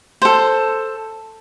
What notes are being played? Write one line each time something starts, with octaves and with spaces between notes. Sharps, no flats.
A4 C5